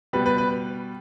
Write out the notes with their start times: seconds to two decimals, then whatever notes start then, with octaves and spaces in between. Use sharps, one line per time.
0.13 B2 G3 B4
0.26 B4
0.38 B4